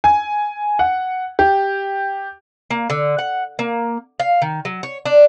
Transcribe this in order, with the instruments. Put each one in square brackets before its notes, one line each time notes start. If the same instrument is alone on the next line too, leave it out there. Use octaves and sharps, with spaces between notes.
[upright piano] G#5
F#5
G4
[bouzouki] A#3
D3
F#5
A#3
F5
D#3
F#3
C#5
D4